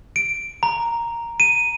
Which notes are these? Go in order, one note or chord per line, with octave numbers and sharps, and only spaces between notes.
D7
A#5
D#7